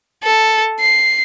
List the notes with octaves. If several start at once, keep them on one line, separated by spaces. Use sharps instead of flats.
A4
C7